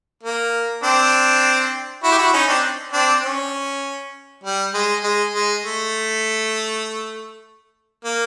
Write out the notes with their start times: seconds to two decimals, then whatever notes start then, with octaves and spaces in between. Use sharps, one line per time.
0.23 A#3
0.83 C4 D4
2.04 E4 F#4
2.12 G4
2.18 E4 F#4
2.33 C#4 D#4
2.49 C4 D4
2.93 C4 D4
3.24 C#4
4.44 G3
4.74 G#3
5.04 G#3
5.34 G#3
5.64 A3
8.05 A#3